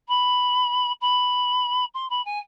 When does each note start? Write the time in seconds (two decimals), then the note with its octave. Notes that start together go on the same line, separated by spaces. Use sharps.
0.08 B5
1.01 B5
1.94 C6
2.10 B5
2.25 G#5